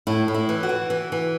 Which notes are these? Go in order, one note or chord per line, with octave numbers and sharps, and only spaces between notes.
A2 E4
A2
E4
E3
F#4
E3
E3
E3